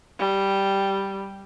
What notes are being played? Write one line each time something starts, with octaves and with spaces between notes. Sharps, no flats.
G3